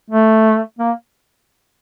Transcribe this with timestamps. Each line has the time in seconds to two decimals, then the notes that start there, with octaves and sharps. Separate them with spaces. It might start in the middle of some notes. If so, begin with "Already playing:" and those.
0.10 A3
0.79 A#3